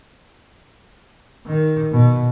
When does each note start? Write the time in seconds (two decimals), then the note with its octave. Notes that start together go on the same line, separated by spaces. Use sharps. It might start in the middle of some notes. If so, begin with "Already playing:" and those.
1.46 D#3
1.92 B2